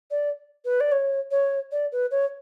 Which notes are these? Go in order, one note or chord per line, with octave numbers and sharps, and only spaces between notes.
D5
B4
D5
C#5
C#5
D5
B4
C#5